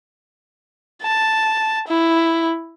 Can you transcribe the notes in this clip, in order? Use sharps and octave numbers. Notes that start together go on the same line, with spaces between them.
A5
E4